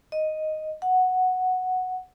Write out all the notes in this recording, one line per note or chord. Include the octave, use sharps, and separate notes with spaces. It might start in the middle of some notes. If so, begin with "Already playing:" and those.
D#5
F#5